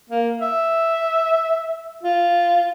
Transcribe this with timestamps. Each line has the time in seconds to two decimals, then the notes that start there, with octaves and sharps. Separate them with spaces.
0.09 A#3
0.41 E5
2.03 F4